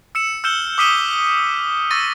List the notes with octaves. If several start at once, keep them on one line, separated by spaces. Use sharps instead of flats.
E6 C#7 E7
E6 F6 G6 C#7 E7 G7
D6 D#6 B6 C#7 D#7 G7
C#6 E6 A6 A#6 D#7